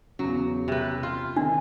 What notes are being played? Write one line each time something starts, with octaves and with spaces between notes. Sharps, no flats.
E2 C#3 F#3
C3 B4
F4
D3 D#3 C4 D4